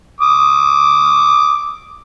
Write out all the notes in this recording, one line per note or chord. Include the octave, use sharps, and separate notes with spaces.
D6 D#6